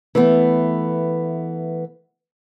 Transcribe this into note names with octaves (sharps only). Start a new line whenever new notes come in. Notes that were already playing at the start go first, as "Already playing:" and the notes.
E3 A3 B3